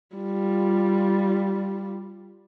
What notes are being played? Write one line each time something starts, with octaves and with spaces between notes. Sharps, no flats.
G3 F4